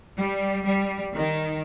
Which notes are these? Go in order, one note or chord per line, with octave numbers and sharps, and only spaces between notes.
G3
G3
D#3